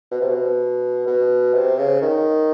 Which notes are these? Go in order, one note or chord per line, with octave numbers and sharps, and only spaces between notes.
B2
C3
B2
B2
C3
C#3
D#3